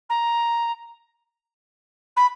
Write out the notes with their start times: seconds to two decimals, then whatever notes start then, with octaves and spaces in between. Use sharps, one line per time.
0.09 A#5
2.16 B5